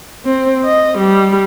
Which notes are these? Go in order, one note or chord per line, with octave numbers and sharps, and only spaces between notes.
C4
D#5
G3